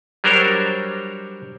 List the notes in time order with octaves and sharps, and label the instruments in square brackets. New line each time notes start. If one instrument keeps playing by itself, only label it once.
[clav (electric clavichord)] F#3 G3 D4 A#4 C5 C#5